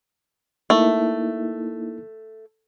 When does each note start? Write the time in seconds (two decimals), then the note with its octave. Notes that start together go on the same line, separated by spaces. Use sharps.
0.70 A3 A#3 D#4 E4